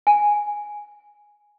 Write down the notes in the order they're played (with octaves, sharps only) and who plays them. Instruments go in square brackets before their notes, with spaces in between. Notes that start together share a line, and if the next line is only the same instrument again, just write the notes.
[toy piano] G#5